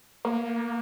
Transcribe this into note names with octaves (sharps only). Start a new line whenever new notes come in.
A#3